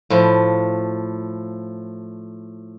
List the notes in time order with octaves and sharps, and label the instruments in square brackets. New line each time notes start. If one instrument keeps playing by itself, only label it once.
[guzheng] A2 F3